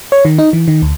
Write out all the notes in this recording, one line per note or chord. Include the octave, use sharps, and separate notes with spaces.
C#5
D#3
D#4
E3
D#3
D2